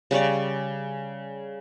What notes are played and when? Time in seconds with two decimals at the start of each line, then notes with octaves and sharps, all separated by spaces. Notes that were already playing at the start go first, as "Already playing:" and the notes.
0.11 C#3 G3 C#5 D5